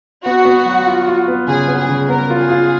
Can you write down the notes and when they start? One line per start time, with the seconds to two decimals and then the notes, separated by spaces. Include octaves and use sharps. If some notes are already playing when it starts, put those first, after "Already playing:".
0.25 B3 F#4
0.45 B3
0.66 F#3
0.87 F4
1.07 F4
1.28 B3
1.48 C#3 G#4
1.68 B3
1.78 G#4
1.89 C#3
2.09 B3 A#4
2.30 F4
2.40 G#4
2.50 F4